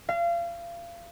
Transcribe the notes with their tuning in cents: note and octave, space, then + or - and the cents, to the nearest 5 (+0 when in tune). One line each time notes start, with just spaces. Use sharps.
F5 -30